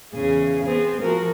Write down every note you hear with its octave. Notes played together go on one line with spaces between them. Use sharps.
E2 C#3 G#4
B3 C4 G#4
F3 F#4 A#4